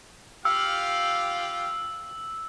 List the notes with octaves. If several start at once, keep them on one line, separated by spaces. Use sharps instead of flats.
F4 G4 F5 E6